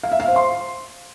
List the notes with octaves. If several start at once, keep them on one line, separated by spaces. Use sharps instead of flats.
F5
E5
F5
C5
C6